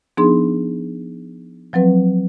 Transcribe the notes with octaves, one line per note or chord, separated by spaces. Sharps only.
F3 B3 D4 D#4 G#4 C6
F3 F#3 C4 B4